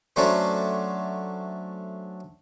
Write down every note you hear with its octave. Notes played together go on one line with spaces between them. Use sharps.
F#3 A3 C#4 D4 C5